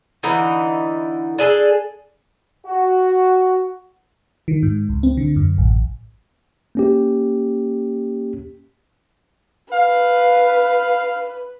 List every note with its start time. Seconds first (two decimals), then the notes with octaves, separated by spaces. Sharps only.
0.23 D3 E3 D#4 E4
1.39 D4 G#4 A4
2.66 F#4
4.48 D#3
4.63 G#2
4.89 C#2
5.03 C4
5.17 D3
5.36 F#2
5.58 A1
6.75 A#3 C#4 G4
9.73 B4 F5